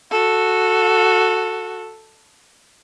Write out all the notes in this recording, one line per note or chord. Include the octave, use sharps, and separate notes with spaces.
F#4 A4